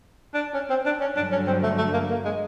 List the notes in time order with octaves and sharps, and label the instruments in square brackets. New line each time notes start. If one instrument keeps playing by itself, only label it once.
[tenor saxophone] D4
C#4
C4
D4
C#4
[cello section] G2 D3 F#3 [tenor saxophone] D4
[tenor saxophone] C#4
C4
A3
A3
A#3
A#3
G#3